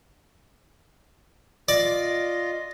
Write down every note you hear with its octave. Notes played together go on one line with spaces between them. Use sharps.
F4 D5 D#5